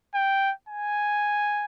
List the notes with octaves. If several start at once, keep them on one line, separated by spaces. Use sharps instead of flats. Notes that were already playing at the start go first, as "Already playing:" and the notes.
G5
G#5